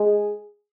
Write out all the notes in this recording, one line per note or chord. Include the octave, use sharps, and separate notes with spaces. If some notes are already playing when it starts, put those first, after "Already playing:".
Already playing: G#3 G#4